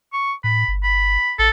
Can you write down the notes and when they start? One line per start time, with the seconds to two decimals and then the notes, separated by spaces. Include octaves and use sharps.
0.13 C#6
0.44 A2 B5
0.68 G1
0.84 B5
1.39 A1 A4